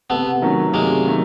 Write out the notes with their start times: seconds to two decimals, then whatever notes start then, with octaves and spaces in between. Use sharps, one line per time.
0.10 C3 A3 B3
0.42 D#3 F#3 A3 C#4
0.74 C3 G#3 A#3
1.06 D#3 F#3 A3